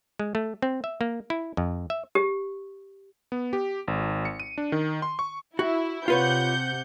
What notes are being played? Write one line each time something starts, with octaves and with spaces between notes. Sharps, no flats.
G#3
A3
C4
E5
A#3
E4
F2
E5
G4
B3
G4
G#1
C#7
D#7
D4
D#3
C6
C#6
E4 F#4
C3 F4 B4 C#5 F#5 G6